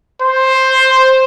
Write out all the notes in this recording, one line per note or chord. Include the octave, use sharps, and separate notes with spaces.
C5